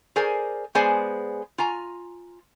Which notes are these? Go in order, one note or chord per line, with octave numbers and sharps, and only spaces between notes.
G#4 A#4 C5 D5 G#5
G#3 B3 G#4 C5 D5 G#5
F4 G#5 A#5